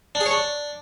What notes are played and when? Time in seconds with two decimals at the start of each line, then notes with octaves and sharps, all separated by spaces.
0.15 D4
0.20 G#4
0.26 C#5
0.31 D4